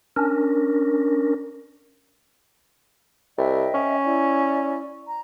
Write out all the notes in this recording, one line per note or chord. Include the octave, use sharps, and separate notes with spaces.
C#4 D4 A#4
C2 D#5 E5 G5
C#4
E4 D5
A#5